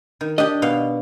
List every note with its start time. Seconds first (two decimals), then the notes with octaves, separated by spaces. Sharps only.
0.21 D#3
0.38 D4 G4 D#5
0.62 B2 F5